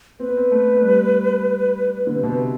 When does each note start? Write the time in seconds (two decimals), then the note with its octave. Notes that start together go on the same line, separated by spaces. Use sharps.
0.20 C4 B4
0.28 B3
0.37 C4
0.52 A3
0.77 A3
0.82 G3
2.07 D3
2.15 C3
2.23 B2
2.30 C3